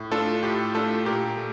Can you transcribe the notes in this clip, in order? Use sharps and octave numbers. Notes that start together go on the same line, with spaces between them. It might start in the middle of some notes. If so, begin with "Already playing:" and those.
Already playing: A2
A3 D4 F4 A4
A2 G4
A3 D4 F4 A4
A#2 G4 A#4
A3